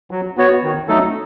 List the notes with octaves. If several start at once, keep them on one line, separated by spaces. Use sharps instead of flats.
F#3
B3 F#4 C#5
D#3
F#3 A3 D#4 A4